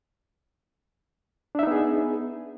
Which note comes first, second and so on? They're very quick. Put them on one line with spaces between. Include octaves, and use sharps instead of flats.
D4 E5 D#4 B3 G#4